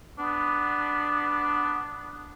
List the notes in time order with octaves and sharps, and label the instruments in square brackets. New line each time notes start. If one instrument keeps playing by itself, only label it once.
[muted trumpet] B3 [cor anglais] D4